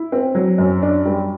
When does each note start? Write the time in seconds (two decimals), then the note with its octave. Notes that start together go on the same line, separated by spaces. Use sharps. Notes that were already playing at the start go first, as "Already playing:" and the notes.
Already playing: E4
0.12 C4
0.35 F#3
0.58 F#2
0.82 D4
1.05 G3